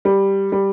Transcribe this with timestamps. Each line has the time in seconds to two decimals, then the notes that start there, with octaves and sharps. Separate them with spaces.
0.05 G3
0.52 G3